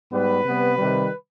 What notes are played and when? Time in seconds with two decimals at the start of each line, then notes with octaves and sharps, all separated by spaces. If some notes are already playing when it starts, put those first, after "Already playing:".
0.11 G#2 G3 B3 B4
0.45 C3 G3 B3
0.77 C3 D#3 G3